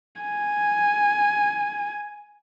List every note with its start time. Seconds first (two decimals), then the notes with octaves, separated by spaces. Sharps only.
0.22 G#5